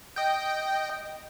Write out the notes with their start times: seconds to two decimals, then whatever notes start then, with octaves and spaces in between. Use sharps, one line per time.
0.16 D#5 G5